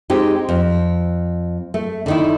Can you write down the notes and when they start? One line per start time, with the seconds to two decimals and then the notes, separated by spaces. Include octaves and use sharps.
0.10 G#3 C4 D#4 G4
0.49 F2
1.74 A3
2.06 D3 D#3 E4